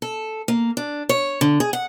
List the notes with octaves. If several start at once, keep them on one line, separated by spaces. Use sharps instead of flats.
A4
A#3
D4
C#5
D3
G#4
F#5